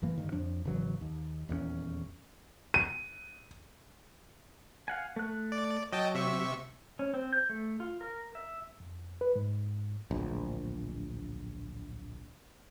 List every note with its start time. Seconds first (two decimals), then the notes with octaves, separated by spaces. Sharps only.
0.02 F#1 F#2 E3 A#3
0.18 G2 D3 D#3
0.32 F2 F3 D4
0.65 G#1 C#3 E3 F#3
1.01 D#2
1.49 D#1 E2 G3 C#4
2.74 D#7
4.88 F5 F#5 G#5
5.16 A3 F#6
5.52 D5
5.92 F#3 D#5 G5 A5
6.14 C3 E5 C#6
6.99 C#4
7.14 C4
7.33 G6
7.49 A3
7.80 F4
8.01 A#4
8.35 E5
8.80 F2
9.21 B4
9.36 G#2
10.11 D1 A#1